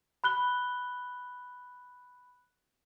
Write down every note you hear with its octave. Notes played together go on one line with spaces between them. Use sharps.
B5 F#6 G7